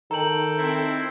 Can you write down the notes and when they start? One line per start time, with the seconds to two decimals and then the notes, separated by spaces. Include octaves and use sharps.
0.11 D#3 A4 G5 A#5 F#7
0.57 C4 E4